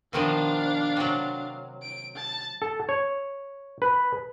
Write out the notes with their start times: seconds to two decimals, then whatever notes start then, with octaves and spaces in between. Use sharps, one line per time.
0.13 B2 D#3 F3 D4 F5
0.97 C3 F#3
1.82 D7
2.15 A5
2.62 A4
2.89 C#5
3.82 B4